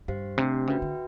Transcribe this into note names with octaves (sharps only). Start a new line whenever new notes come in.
G2 G4 C5 F5
C3 A3 D4 G4 C5
C#3 F#4 B4 E5 G5
D3